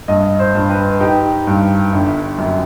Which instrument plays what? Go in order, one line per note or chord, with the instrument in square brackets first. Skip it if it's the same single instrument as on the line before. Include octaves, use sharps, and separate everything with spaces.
[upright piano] G2 D#5
C5
G2
B4
D#4 G4
G2
G1
F#2